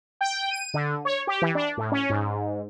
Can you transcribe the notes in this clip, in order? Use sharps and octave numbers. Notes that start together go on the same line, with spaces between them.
G5
D#7
D3
C#5
G4
E3
D4
A2
C#4
G#2